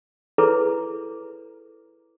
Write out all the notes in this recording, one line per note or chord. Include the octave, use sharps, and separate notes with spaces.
E4 G#4 A4 B4 C#5 A#5